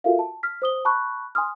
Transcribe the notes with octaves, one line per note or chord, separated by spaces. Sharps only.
F4 F#4 A4 A#4 E5 F5
A5
F6 B6
C5 D#6 G7
A5 B5 C#6 F#6
G#5 C6 D#6 F6